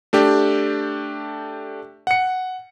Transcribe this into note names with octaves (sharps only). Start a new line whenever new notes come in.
A3 D4 G4
F#5 C#7